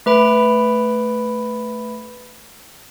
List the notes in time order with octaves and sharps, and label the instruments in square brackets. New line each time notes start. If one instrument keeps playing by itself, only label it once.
[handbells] A3 B4 B5 D7